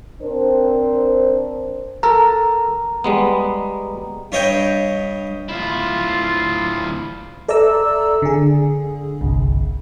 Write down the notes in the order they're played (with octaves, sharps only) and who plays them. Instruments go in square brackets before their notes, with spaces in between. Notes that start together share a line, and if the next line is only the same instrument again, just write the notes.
[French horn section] C4 D4 A#4 C5
[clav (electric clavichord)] A4 A#4 [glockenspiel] A#5
[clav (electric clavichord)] G3 G#3 B3
[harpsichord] G2 C#5 D#5 G5
[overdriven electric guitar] D2 E4 [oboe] F4
[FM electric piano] A4 D5 E5 A#5 E6
D3 G#4
G1 C2